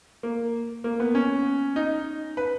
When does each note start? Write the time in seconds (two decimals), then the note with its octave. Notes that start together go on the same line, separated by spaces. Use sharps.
0.23 A#3
0.84 A#3
1.00 B3
1.15 C#4
1.76 D#4
2.37 B4